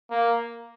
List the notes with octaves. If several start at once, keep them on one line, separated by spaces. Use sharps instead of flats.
A#3